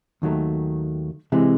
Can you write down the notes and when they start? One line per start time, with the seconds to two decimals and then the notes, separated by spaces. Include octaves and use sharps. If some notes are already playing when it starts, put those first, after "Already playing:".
0.22 D#2 D#3 F#3 A3
1.32 C3 E3 G#3